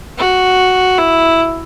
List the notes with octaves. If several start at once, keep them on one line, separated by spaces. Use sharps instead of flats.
F#4
E4